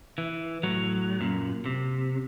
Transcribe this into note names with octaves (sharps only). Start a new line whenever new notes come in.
E3
A2 F#3
F#2 A#2
C3